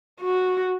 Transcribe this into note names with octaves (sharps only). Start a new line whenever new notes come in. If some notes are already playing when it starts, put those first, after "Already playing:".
F#4